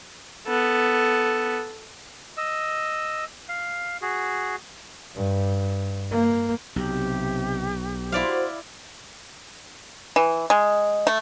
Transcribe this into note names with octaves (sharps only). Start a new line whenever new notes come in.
B3 A4
D#5 E6
F5
F#4 G#4
G2
A#3
B1 C3 G4
E4 F#4 C5 D5 F5
E3
G#3
A3